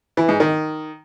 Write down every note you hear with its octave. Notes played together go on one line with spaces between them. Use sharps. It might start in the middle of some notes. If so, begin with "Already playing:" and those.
E3
G#2
D#3